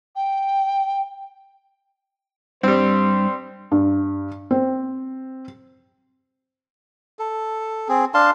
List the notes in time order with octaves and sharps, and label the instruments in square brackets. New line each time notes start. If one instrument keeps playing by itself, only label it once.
[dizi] G5
[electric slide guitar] G2 [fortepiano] G3 C4 [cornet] C5
[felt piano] G2
C4
[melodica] A4
C4 G#4
D4 F5 A5 C6